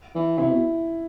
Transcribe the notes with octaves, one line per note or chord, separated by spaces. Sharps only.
E3
C3 E4
B2